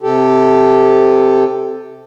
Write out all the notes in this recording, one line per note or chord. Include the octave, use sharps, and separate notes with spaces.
C3 G4 A4